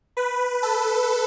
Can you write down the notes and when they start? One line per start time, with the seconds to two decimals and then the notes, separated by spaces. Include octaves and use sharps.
0.17 B4
0.63 A4